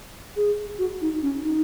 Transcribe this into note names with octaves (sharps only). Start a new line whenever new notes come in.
G#4
F#4
D#4
C#4
D#4